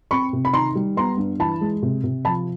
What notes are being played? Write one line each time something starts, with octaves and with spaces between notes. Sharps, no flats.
C4 B5 C#6
C3
B5
D#3 A#5 C6
G3
B3 A#5 C6
G2
E3 A5 B5
G#3
C3
C3
F3 A5 B5